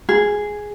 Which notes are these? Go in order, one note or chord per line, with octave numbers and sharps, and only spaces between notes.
G#4